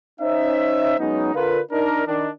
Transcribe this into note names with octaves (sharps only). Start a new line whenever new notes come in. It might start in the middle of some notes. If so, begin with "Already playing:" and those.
C#4 D#4 C5 E5
F#3 G#3 B3 C#4 D#4
D3 F4 A#4 B4
D4 D#4 A#4
D#3 D4